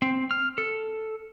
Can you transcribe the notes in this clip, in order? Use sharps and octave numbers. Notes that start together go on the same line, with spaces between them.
C4
F6
A4